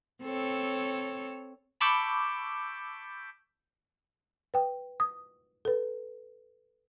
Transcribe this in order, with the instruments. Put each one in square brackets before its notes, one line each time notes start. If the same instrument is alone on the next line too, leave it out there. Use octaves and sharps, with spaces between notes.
[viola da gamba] C4 A4 C#5
[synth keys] A5 B5 C#6 D6 E6 G6
[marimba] B4 G5
D#6
A4 B4